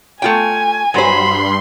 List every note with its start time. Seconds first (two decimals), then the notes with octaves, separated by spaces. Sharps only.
0.22 A3 F4 G5 G#5
0.94 G2 F#3 C5 B5 C6